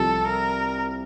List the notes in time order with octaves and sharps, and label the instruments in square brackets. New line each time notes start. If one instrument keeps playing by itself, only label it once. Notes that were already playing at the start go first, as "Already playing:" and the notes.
Already playing: [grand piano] C2 C3 F3 [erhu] A4
[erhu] A#4